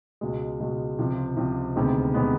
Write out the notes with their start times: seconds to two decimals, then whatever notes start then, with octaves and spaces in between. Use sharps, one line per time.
0.21 C#2 B2 G#3
0.60 C#2 B2 G#3
0.99 C#2 C3 F3
1.37 C#2 C3 F3
1.76 D2 C3 D#3 G#3 B3
2.14 C3 D#3 G#3 B3